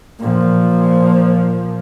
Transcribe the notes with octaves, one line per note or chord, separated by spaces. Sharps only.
A#2 F3